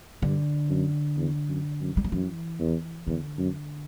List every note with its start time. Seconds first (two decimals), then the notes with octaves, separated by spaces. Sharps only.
0.22 G2 D3
0.70 F#2
1.17 E2
1.49 F#2
1.81 F#2
1.97 G3
2.04 F#3
2.12 F#2 E3
2.60 E2
3.07 E2 D3
3.39 F#2